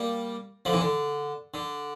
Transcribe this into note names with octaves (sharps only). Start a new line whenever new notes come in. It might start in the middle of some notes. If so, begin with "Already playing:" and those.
Already playing: G3 A#3
D3 F3
C3 E3
D3
D3